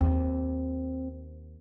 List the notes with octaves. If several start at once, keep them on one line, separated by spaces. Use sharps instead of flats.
D#2 C4